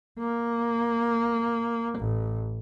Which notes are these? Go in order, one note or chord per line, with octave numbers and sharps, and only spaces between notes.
A#3
A1